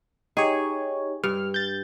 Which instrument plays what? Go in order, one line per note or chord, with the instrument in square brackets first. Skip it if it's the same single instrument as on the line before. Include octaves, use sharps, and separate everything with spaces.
[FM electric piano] D#4 G4 C#5 [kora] G#4
[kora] G2 [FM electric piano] F6
[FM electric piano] G6 A6